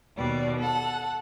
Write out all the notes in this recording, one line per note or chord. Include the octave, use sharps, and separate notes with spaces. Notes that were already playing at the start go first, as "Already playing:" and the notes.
D#2 B2 G3 D5
A4 F#5